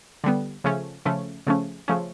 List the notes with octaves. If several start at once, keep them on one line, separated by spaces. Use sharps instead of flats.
D3 G3 B3
C#3 F3 A3 C#4
C#3 F3 A3 C#4
C#3 F3 A3 C#4
C#3 F3 A3 C#4